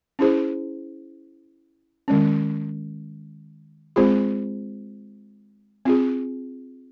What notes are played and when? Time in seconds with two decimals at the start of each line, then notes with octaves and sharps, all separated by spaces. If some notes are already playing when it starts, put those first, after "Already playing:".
0.19 C#4 E4 G#4 C5
2.08 D#3 G#3 C#4
3.96 G#3 C4 F4 G#4 C5
5.85 C4 F4 G#4